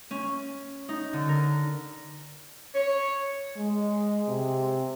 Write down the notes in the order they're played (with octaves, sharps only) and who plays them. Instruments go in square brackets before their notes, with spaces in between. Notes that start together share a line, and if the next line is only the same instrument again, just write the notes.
[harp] C#4
D#4
D3
A#4
[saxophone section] C#5
[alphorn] G#3
C3